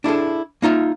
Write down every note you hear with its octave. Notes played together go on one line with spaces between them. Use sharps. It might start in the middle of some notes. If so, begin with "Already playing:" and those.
D4 E4 G#4 A4
A#3 D#4 F4 E5